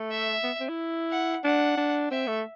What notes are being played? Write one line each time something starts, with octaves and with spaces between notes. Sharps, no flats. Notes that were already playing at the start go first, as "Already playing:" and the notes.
Already playing: A3
E5
B3
C4
E4
F#5
D4 F#5
D4
C4 E5
A3